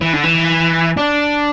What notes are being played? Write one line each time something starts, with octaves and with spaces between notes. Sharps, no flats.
E3
D3
E3
D4